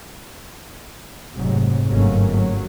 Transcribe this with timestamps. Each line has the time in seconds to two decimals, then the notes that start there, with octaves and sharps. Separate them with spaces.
1.35 F1 G#2 C3 F#3
1.88 G1 G#2 F#3 A3 A#3 C#4
2.30 F#3